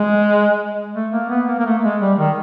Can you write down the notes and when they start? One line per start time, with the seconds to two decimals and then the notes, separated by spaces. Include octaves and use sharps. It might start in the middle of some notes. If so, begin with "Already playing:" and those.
Already playing: G#3
0.95 A3
1.12 A#3
1.29 B3
1.48 A#3
1.59 A#3
1.66 A3
1.83 G#3
2.01 G3
2.19 D#3